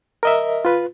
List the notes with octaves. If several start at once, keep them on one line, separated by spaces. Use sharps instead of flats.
A#4 D#5 E5
F4 B4